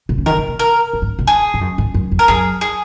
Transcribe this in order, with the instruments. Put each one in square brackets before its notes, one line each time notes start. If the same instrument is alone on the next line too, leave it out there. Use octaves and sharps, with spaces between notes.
[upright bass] B2
C#3
[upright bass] D#3 [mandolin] A#4
[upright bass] C#3
B2
[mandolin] A#4
[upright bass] A#2
G#2
B2
[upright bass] F2 [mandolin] G#4
[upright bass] G#2
F#2
G#2
F#2
F2
[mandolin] A#4
[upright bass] F#2 [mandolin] G#4
[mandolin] G#4